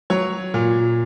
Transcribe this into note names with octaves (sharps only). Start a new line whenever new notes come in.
F#3 C#5
A#2